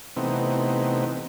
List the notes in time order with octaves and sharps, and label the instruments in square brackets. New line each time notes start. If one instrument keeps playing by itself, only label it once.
[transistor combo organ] C3 E3 A3 B3 C4 D#4